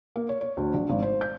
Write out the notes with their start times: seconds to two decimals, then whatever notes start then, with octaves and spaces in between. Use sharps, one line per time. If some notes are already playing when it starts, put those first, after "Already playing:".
0.16 A#3
0.29 C#5
0.41 C#5
0.57 D2
0.74 A#1
0.90 G#1
1.02 C5
1.21 G6